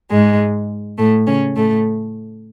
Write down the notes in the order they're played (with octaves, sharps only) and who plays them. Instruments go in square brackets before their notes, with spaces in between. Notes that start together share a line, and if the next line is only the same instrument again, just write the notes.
[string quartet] G#2 G#3
A2 A3
C#3 C#4
A2 A3